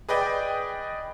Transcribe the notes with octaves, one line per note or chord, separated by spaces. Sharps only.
G#4 B4 D5 D#5 G5